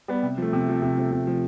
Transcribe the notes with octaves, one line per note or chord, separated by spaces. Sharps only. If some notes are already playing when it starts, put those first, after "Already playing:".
G3 B3
C3
F3 A3
C3
F3 A3
C3
F3 A3
C3
F3 A3